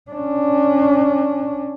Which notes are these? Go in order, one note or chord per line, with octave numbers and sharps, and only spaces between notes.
C#4 D4